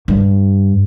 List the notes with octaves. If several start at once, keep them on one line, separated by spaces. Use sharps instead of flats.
G2